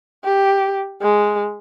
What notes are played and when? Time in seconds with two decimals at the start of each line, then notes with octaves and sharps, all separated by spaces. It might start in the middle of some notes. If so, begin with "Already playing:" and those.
0.24 G4
1.02 G#3